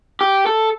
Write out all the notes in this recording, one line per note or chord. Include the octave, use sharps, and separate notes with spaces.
G4
A4